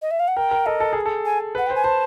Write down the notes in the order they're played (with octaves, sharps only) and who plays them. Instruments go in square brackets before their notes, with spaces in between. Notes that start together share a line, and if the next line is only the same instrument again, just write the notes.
[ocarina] D#5
E5
F5
F#5
[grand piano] A#4 [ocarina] G5
[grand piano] A#4
[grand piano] A4 [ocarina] D#5
[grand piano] A4
G#4
A4
[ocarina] G#5
[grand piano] B4 [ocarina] F#5
[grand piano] C5 [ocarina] G5
[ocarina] G#5
[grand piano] C5 [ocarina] A5